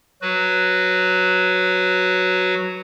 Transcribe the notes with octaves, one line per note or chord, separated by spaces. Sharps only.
F#3 F#4 B4